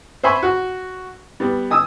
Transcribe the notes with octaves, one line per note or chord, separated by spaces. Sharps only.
C5 E5 G#5 B5 C#6
F#4
G3 B3
G#5 D#6 E6